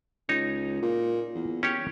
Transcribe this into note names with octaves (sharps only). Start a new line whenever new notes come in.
C#2 D#4 C#5
A#2
E2
C#4 G4 C#5